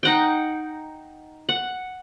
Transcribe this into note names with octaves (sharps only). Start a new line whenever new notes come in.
D#4 F#5 G5
F#5